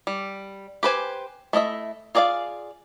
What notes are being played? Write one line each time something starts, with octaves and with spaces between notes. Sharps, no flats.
G3
G4 B4 C5 G#5
A3 E4 D#5 E5
F4 G#4 D5 D#5 F5